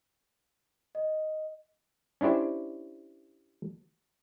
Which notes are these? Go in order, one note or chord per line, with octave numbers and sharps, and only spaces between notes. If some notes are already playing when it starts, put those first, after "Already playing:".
D#5
C#4 D4 E4 G4 C5